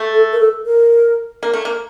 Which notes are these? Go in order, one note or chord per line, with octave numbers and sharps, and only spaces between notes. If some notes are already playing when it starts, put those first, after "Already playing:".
Already playing: A3
A4
A#4
A4
A#4
A#3
A3
A#3